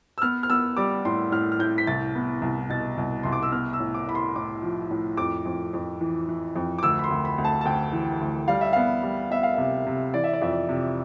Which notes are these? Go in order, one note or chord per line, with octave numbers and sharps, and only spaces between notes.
E6
B3 F6
F6
B3 E6
G3 D6
A2 C6
A2 F6
F6
A2 G6
B6
C2 A6
B3
C2
B2 A6
C2
C2 C6
D6
E6
B3 F6
E6
A2
D6
A2 B5
C6
A2 D6
F3
A2
F2 D6
F2
F2
E3
E3
F2
D6
D2 E6
B5
C6
D2
B5
D2
A5
A5
D2 G5
E3
D2
G3 F5
E5
B3 F5
G3
B3 E5
F5
C3 E5
C3
E3 D5
E5
D5
F2 E5
D5
C3